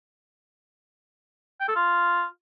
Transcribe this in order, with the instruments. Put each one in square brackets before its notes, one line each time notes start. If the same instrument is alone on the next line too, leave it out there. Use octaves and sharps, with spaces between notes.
[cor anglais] G5
A4
F4